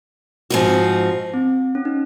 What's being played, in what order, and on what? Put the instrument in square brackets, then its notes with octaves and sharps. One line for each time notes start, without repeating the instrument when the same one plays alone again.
[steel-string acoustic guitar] G#2 F3 C4 D#4 F#4
[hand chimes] C4
C#4
D#4